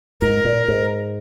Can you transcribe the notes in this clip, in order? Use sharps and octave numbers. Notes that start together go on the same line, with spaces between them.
G#2 A#4
A#2
G#2